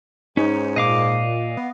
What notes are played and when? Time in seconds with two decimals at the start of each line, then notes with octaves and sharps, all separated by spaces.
0.37 G#2 C#4 D#4
0.76 A#2 D#5 F5 D6
1.57 B3